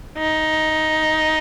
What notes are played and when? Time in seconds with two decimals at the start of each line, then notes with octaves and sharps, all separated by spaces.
0.18 D#4